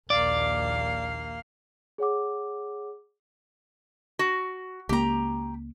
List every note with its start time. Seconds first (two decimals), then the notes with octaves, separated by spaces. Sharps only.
0.10 A#1 D#2 A#3 D5 F5
1.98 G#4 C#5 F#5 D6
4.19 F#4
4.89 C#2 A#3 G4 A#5